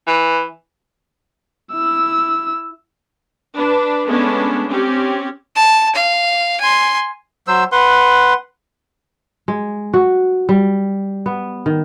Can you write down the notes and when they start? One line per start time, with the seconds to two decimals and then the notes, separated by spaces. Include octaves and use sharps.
0.07 E3
1.72 E4 E6
3.56 D4 B4
4.07 G#3 A3 B3 C#4 D4
4.70 C4 C#4 G4
5.56 A5
5.95 F5
6.61 G#5 C6
7.48 F#3 C5 E6
7.72 B4 F#5 C6
9.48 G#3
9.94 F#4
10.49 G3
11.26 B3
11.66 D#3